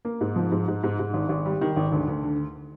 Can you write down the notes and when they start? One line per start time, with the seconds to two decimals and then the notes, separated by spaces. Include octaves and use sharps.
0.05 A#3
0.21 G#2
0.36 F3
0.52 G#2
0.68 G#2
0.83 G#2
0.99 G#2
1.14 G#1
1.29 G#1
1.45 G3
1.61 D#3
1.76 G#1
1.92 D2
2.08 D2
2.23 D3